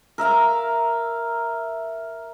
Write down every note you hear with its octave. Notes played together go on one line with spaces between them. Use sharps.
A#4 E5 F5 A#5